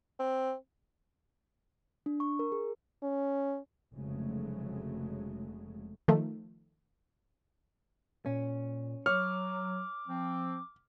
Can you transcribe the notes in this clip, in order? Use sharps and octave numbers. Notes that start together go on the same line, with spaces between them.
C4
D4
C#6
A#4
G#4
C#4
F1 C#3 F#3 G#3 A3
D#3 F3 A3
A#2 C#4
F#3 C#5 D6 F6
F3 C4